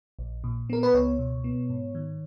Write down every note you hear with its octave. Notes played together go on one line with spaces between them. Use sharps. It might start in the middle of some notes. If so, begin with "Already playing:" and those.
A#1
A#2
B3 A#4
B4
C#2 C#5
B2
B3
G#2
D#3